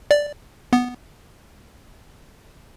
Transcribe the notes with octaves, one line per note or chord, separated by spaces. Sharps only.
D5
B3